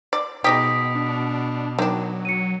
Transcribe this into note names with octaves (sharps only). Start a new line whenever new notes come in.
D5
B2 G#3 D#4 G4 D#6 B6
D4
D#3 F#3 D4
C#7 D#7